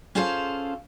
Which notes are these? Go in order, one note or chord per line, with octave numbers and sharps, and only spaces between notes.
C#4 F4 G#4 A4 C5 F5